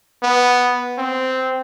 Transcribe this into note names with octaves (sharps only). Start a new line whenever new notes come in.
B3
C4